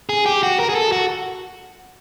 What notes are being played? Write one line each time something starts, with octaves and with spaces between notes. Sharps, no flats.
G#4
G4
F#4
A#4
G#4
A4
F#4